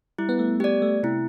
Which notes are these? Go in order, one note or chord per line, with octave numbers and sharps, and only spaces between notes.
G3 E4
B3
A3
B3 G4 D5
A3
C3 E4